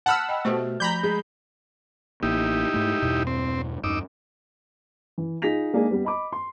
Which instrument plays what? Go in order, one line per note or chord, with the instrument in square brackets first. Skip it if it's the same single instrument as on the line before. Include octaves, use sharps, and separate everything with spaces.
[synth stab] F#5 B5 E6 [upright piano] A5 F6
[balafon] D#5 G5
[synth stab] B2 A3 [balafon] F#4 G4 C5
[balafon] F3 A3 [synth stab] A#5 B5 G6
[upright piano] G#3
[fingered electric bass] A1 A#3 [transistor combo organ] D#4 E4 G4
[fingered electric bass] G#2 A3
E2 G2 B2
[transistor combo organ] C4
[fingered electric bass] E2 G2 [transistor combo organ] D#4 D6 E6
[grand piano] E3
D#4 F4 G#4 A#6 B6 F7
G#3 A#3 D4 D#4 G#4
G3 B3
D#5 B5 D6
C6